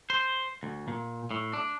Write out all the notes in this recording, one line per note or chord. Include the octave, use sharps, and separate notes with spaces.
C5
D2
A#2
A2
D4